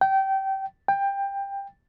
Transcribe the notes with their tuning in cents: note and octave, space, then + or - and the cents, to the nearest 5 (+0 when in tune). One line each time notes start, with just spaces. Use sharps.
G5 -25
G5 +15